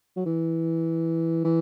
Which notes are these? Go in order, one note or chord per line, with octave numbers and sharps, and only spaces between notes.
F#3
E3
E3